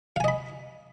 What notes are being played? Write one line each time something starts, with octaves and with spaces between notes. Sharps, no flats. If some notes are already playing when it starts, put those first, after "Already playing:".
D#5 F5 G#5 B5